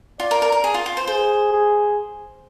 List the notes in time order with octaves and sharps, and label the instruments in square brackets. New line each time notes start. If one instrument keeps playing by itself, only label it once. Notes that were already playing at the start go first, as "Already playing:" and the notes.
[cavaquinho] F4 [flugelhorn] D5
[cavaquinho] A#4
A#4
A#4
G#4
F4
F4
C5
[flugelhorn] G#4 [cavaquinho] C5
[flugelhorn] G#4